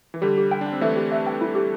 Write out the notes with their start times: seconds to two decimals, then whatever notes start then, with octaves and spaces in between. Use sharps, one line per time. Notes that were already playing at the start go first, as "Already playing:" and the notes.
0.14 E3
0.22 D3 G3 G4
0.38 G4
0.51 G5
0.61 D4
0.67 G5
0.72 C4
0.81 E3 A3 E5
0.96 G4
1.12 E5
1.27 G5
1.41 E4
1.55 G4